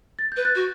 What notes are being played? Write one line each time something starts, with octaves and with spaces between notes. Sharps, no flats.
A6
B4 G6
F#6 A6
F#4